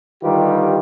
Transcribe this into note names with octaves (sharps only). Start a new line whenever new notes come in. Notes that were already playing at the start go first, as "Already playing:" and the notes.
D3 D#3 G3 F4 G4 B4